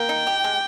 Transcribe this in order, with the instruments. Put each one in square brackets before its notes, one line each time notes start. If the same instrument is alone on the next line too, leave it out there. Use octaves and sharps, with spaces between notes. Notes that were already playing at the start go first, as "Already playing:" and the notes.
Already playing: [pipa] A#3 [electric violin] G5
[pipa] D#4
G4
G#3